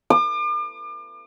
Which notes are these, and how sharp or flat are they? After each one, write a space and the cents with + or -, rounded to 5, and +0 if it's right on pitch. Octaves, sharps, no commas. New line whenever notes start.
D6 +40